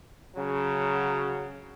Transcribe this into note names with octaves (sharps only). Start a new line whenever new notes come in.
C#3 F#3